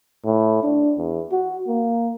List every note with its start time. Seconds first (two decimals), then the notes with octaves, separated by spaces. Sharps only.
0.25 A2
0.63 D4
0.98 E2
1.32 F#4
1.68 A#3